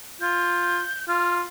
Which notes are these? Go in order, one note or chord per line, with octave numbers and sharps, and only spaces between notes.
F4 G6
F4 F6